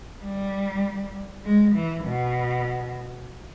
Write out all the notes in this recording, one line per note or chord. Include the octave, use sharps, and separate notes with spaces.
G3
G#3
E3
B2